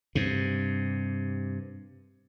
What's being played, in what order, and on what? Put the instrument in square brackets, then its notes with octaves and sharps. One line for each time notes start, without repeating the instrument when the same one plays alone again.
[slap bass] G2 C3